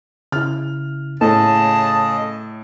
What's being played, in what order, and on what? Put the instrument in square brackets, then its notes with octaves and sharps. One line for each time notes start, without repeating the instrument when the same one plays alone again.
[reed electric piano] C#3 E4 [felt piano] F6
[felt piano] A2 [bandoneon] C#3 G#4 D#5 [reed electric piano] A4 [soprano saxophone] A5